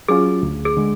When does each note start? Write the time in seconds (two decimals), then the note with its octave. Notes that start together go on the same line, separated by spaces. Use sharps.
0.08 F#3 C#4 F4 G#4
0.43 D2
0.65 G#4
0.77 D3 G#3